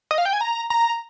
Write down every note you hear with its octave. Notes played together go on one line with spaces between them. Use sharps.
D#5
F5
G5
G#5
A#5
A#5